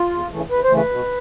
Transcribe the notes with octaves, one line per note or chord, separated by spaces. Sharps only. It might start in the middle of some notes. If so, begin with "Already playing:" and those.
Already playing: F4
E2
C#3 E3 A3
E2 B4
C5
C#3 E3 A3
B4
B2